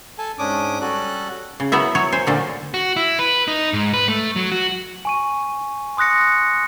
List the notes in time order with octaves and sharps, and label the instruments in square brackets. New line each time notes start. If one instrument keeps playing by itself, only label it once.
[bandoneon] A4 G#5 A5
G#2 C#4 D4 D6 D#6
G3 C#4 F#4 A4 F#6
[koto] C#3
F#3 B3 E4 E5
F#3 C#5
C5 G#5
A#2 D3 A3
[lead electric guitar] F#4
E4
B4
D#4
G#2
B4
A3
F#3
F#4
[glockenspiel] G#5 C#6 D#7
C6 D#6 F#6 A#6 C#7